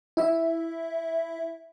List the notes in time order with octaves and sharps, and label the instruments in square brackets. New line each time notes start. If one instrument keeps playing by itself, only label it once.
[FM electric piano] E4 E5